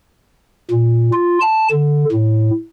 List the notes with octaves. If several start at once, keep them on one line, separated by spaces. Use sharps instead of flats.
A#2
F4
A5
D3
A2